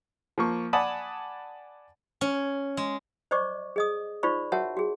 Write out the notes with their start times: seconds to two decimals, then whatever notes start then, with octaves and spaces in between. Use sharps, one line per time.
0.38 F3 A#3 C#6
0.73 D5 F#5 G#5 A5 B5 D#6
2.21 C#4
2.77 G#3
3.31 C5 D5 D#5 C#6 D6
3.76 G#4 D#5 D#6
4.23 D#4 F4 C5 D5 B5 C#6
4.52 F#4 A#4 C#5 E5 F#5 A5
4.77 F#4 G#4